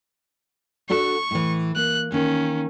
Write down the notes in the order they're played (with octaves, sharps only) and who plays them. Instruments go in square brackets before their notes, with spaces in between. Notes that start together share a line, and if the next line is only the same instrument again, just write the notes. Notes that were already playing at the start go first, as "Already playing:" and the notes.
[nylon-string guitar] D4 F#4 A4 [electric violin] C#6
[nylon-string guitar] A2 E3
[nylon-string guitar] A#3 [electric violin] F#6
[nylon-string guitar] D#3 A#3 [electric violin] C#4